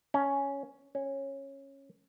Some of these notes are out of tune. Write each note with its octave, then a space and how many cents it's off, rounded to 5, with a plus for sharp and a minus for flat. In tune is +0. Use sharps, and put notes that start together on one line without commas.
C#4 +5
C#4 -15